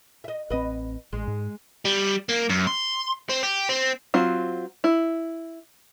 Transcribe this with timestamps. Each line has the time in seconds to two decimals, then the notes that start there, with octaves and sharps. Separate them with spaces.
0.24 D#5 E5
0.50 A1 C4 B4 D#5
1.13 A1 G#3
1.27 G#2
1.85 G3
2.29 A#3
2.49 F#2
2.67 C6
3.29 C4
3.43 G4
3.69 C4
4.14 F#3 C4 F4
4.84 E4